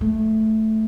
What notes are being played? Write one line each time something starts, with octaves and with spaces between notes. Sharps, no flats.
A3